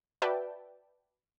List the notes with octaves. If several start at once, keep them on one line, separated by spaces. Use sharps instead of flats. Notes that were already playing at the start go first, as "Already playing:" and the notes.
F#4 B4 D5 E5 G5 A5